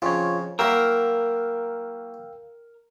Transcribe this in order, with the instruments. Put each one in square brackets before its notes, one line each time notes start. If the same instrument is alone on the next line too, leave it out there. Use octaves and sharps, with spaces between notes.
[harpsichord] F2 C#3 [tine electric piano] F4 C#5
[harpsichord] F#3 A#3 E4 [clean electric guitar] A#4 [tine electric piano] F5 G5 E6